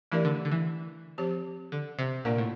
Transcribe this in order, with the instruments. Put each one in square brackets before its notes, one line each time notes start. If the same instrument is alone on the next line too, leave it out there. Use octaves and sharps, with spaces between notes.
[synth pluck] E3 [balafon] A3 D4 G4 A#4 D5
[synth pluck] D3
D3
E3
[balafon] F3 C4 G4 C5
[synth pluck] D3
C3
[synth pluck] A#2 [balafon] A#3 D4 F4 A#4 D5
[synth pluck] A2